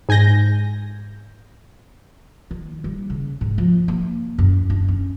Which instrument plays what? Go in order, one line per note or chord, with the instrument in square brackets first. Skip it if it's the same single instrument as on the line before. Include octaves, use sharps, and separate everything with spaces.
[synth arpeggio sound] G#2 G#5 G6 A#6
[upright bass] D#3
G3
C#3
G#2
F3
A#3
F#2
D4
C#4